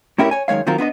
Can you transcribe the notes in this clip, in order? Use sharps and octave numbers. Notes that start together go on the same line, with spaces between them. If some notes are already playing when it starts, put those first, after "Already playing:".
A2 C#4 E4 G4 A#4 C#5
C#5 G#5
F#2 D#3 G#3 C#5 F5
D#3 F#3 C4 F4 A#4
B3 D4 B4 D#5